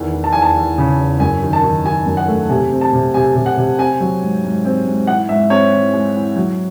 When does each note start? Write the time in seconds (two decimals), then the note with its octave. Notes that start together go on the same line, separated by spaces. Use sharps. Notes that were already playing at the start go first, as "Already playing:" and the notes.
Already playing: E2 D#3
0.14 E3
0.24 A5
0.32 E2 G#5
0.42 A5
0.56 E2
0.78 C#3
0.98 E2
1.20 F#2 G#5
1.42 D#3
1.53 A5
1.63 D#3
1.85 D#3 G#5
2.06 F#2
2.17 F#5
2.28 A3
2.50 C3 G#5
2.71 C4
2.81 A5
2.93 C3
3.14 C3 G#5
3.35 C3
3.46 F#5
3.57 C3
3.78 C4 G#5
4.00 F#3
4.22 G#2
4.44 G#2
4.65 C4
4.87 G#2
5.07 E3 F#5
5.29 G#2 E5
5.50 C4 C#5
5.72 E3
5.93 G#3
6.15 E3
6.36 F#3